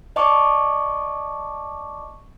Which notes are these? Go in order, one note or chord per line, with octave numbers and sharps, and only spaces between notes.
D5 D#5 A5 C#6 D6